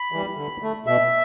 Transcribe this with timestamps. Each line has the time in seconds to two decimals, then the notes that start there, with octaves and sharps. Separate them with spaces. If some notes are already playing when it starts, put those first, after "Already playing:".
Already playing: B5
0.12 E3 G3
0.37 D3
0.62 A3
0.87 B2 E5